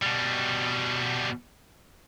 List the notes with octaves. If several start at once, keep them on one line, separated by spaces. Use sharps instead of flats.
B2 G3